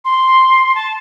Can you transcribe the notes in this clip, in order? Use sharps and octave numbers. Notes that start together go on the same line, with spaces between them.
C6
A5